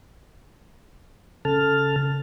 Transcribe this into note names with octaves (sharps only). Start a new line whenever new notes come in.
C#3 A4 A5 F6